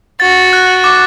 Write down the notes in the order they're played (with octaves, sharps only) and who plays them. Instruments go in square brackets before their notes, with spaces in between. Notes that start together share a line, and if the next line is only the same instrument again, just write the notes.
[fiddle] F#4 [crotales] A6
[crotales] F#6
D6